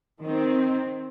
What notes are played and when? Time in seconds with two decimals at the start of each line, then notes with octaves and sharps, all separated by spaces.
0.22 D#3 C4